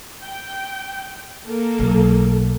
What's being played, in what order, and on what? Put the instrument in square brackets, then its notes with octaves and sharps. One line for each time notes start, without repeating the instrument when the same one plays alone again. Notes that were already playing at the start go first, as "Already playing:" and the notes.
[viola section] G5
A#3 A4 A#4
[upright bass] B1